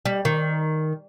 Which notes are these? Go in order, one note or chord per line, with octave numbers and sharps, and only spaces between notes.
G3
D#3